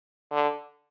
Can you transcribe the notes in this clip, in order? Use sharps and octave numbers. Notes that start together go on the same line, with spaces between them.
D3